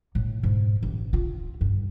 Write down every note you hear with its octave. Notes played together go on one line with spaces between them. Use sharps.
A2
G#2
A1
F4
G2